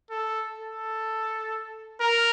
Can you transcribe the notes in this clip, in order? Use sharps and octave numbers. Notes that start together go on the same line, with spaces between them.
A4
A4
A#4